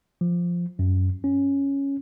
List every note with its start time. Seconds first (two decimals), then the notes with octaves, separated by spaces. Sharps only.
0.21 F3
0.79 F#2
1.24 C#4